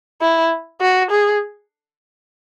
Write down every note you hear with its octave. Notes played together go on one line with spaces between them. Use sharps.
E4
F#4
G#4